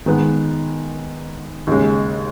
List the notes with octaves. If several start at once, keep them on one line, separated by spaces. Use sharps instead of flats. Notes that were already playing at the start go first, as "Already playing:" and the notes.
D#3 G#3 B3
D#2 C#3 G#3